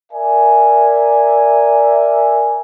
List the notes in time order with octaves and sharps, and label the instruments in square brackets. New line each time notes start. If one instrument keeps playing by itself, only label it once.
[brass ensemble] A#4 D5 E5 G#5